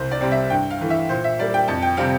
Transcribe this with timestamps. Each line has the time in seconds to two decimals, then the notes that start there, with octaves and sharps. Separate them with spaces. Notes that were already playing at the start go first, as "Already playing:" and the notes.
Already playing: C2 C5
0.11 D5
0.21 C3 G3 C4
0.31 E5
0.50 G2 G5
0.71 F5
0.81 E3 A3
0.90 E5
1.09 A#2 C5
1.24 E5
1.39 G3 A#3 D5
1.54 G5
1.68 F2 A5
1.82 G5
1.97 C3 G3 C4 F5